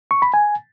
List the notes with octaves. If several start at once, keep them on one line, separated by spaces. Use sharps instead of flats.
C#6
B5
G#5